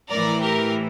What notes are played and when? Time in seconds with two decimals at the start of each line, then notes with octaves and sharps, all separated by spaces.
0.10 A2 E3 A#4 D5
0.41 G4 A#4